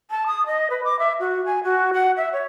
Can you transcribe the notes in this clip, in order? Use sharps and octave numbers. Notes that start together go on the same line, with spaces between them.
A5
D#6
D#5
B4
D6
E5
F#4
G#5
F#4
F#5
E5
C#5